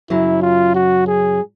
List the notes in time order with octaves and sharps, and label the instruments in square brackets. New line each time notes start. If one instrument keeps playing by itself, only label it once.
[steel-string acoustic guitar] F#2 C#3 F#3 [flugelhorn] E4
[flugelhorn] F4
F#4
G#4